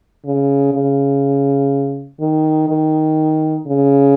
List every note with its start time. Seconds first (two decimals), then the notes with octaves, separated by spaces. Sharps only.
0.25 C#3
0.73 C#3
2.20 D#3
2.69 D#3
3.67 C#3